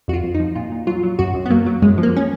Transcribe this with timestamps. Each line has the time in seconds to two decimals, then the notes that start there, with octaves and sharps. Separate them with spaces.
0.08 F2 F#4
0.13 F4
0.24 F2
0.35 D#4
0.40 F3
0.56 A#2 F4
0.72 A#2
0.87 F#3 F4
1.03 F#3
1.19 F#2 F#4
1.35 F#2
1.46 B3
1.50 F#3 A#3
1.66 F#3
1.82 F#2 G#3
1.98 F3
2.03 A#3
2.17 C#4